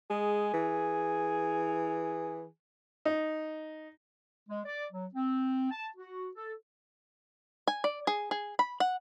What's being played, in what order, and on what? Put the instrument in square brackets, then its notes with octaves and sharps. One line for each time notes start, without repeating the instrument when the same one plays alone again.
[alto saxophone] G#3 [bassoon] G#4
[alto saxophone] E3
[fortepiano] D#4
[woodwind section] G#3
D5
F#3
C4
A5
F#4
A4
[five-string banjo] G#5
D5
G#4
G#4
B5
F#5